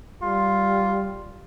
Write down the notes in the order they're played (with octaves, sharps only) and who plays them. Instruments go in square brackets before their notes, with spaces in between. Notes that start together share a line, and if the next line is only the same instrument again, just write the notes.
[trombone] G3 [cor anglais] F4